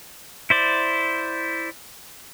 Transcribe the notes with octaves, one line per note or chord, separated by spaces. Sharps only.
E4 C5 D5